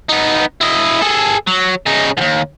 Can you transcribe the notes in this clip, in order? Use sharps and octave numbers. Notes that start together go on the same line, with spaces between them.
B3 D#4
E4 D#5
G#4 A4
F#3
C#3 D#4
D#2 G#2